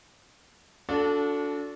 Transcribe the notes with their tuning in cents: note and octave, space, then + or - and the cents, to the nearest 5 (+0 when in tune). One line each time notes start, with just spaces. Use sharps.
D4 -20 F#4 -40 A4 +0